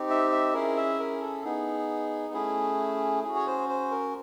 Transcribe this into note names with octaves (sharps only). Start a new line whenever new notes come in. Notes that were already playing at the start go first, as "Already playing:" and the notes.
Already playing: C4 D#4 G4
E5
E5
C#4 E4 G#4 A#4
E5
A#4
A4
B3 D#4 G#4
A3 C#4 E4 G#4
C#4 F#4 G#4
C#5
C5
C5
A#4